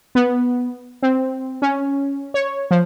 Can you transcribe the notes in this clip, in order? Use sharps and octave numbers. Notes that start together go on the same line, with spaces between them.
B3
C4
C#4
C#5
F3